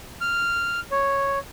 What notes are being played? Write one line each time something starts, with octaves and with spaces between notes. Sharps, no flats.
F6
C#5